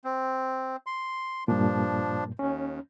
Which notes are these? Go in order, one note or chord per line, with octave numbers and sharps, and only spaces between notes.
C4
C6
G2 A#2 F3 D4
D#2 C#4